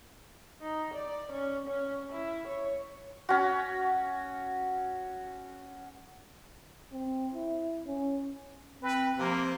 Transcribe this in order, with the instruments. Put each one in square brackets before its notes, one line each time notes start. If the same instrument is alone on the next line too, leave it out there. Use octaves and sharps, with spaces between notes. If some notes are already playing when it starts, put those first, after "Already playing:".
[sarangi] D#4
D5
C#4
C#4
E4
C#5
[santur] C#4 F#4
[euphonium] C4
E4
C#4
[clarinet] C4 [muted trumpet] B4
[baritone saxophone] C3 [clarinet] F3 [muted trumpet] A#3